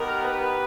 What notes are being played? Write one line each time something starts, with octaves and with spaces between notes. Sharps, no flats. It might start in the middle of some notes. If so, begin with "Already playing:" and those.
Already playing: B3 D#4 G4 A#4
B4